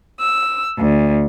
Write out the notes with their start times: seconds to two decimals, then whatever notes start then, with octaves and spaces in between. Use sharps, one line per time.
0.20 E6
0.78 D2